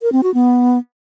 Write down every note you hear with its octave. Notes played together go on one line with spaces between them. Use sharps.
A#4
C4
F#4
B3